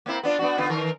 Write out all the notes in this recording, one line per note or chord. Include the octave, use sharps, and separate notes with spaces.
A#3 C4 E4
B3 D4 F4
B3 D4 F#4
D3 B3 F4
D#3 A#4